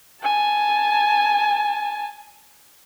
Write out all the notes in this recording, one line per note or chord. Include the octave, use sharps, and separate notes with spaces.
G#5 A5